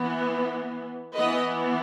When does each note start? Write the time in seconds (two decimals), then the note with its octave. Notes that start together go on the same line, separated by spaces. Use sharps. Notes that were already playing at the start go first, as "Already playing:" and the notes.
Already playing: E3 B3
1.15 E3 B3 B4 D#5